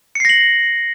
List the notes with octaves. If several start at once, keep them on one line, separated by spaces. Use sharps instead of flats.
A#6 C7 C#7 F#7